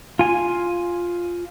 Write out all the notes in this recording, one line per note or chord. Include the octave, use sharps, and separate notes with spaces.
F4 G#5